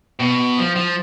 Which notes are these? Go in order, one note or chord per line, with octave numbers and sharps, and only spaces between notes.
B2
F3
F3